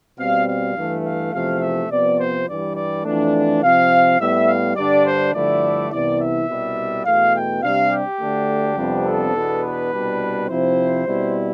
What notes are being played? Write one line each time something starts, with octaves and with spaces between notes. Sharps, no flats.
B2 G3 C4 F5
F5
G2 E3 A3
F5
E2 C3 F3 A3 F5
E5
C3 F3 B3 D5
C5
G2 E3 G3 D5
D5
F2 E3 A3 D4
C3 F3 C4 F5
A2 G3 B3 E5
F5
G2 D3 G3 D4 D5
C5
G2 D3 F3 A3 E4 D5
C2 C3 E3 B3 E4 D5
E5
C2 B2 G3
E2 B2 A3 F5
G5
C3 G3 D4 F5
G4
D2 D3 A3 D4
F2 C3 G3 B3 D4
A4
E2 B2 B3 D4
B4
C2 B2 G3 D4
C3 F3 C4 E4 C5
B2 G3 C4 E4